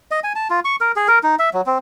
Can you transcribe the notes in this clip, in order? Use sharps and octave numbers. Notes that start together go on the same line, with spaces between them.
D#5
G#5
A5
F4
C#6
A#4
G#4
A#4
D#4
E5
F#3
C4